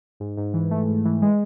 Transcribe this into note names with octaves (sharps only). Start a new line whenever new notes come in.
G#2
G#2
E3
A3
G#2
E3
G#3